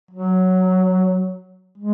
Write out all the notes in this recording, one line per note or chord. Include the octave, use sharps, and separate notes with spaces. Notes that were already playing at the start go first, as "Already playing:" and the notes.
F#3
G#3